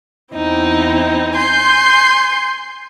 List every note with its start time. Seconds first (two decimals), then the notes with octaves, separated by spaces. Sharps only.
0.34 E2 C4 D#4 E4
1.35 G#5 C6 G6